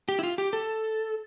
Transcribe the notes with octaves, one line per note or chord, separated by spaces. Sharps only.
G4
E4
F4
G4
A4